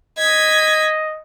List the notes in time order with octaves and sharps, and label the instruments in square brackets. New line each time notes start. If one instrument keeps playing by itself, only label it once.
[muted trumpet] D#5 [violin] G#6 B6